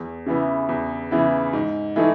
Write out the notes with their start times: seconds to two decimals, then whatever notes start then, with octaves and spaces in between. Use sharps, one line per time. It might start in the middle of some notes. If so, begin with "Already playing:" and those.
Already playing: E2
0.26 C#3 E3 B3 E4
0.69 E2
1.11 C#3 E3 B3 E4
1.53 G#2
1.96 E3 A3 D#4